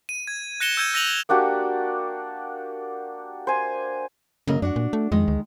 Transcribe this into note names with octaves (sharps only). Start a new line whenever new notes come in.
D#7
G#6
F#6 A#6 C#7 E7 G7
E6 G6 G#6 D#7
E6 A#6 D#7 F7 F#7
A#3 D4 F#4 G4
C5 G#5
F#2 C#3 A#3 D#5
F#2 D4 F#4 F#5
A#2
A3
F2 D#3 G#3 D#5
D2